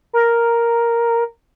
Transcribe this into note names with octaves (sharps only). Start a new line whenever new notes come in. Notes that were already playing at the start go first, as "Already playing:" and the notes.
A#4